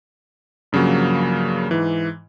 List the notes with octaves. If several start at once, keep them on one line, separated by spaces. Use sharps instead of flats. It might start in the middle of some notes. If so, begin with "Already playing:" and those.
G2 C#3 F3 F#3 A#3
G#2 E3